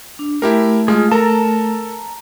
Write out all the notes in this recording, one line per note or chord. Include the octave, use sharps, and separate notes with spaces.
D4
A3 E4 G4 A#4
G#3 F4 G#4
A4 A#4 A5 A#5